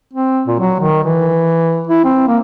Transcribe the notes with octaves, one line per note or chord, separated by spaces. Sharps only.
C4
A#2
F#3
D#3
E3
E4
C4
A#3